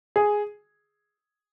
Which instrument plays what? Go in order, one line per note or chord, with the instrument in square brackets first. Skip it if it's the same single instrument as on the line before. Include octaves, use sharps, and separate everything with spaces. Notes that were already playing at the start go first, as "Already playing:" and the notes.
[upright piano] G#4